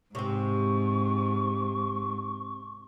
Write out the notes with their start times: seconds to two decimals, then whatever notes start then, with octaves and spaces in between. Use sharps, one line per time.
0.15 G#2 C3 C4 C#6